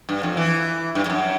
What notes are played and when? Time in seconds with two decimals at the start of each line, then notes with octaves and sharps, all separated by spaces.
0.09 G2
0.23 F2
0.37 E3
0.95 G2
1.06 G2
1.10 F#2